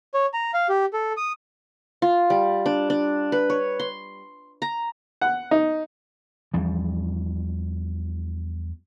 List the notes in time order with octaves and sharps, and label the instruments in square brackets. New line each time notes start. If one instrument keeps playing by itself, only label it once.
[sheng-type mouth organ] C#5
A#5
F5
G4
A4
D#6
[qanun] F4
G3
D4
D4
B4
C#5
C6
A#5
[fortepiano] F#5
D#4
[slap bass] E2 F3 G3